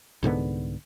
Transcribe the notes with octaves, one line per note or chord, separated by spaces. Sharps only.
C2 G#2 D3 B3